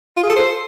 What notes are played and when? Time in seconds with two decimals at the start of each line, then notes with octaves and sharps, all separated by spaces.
0.17 F4
0.23 G#4
0.30 A4
0.36 C5